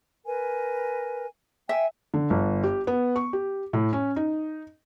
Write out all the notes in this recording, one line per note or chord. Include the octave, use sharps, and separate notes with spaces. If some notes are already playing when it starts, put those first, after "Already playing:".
A#4 B4 G#5
E5 G5 G#5
D3
G1
G4
B3
C#6
G4
A2
C#4
D#4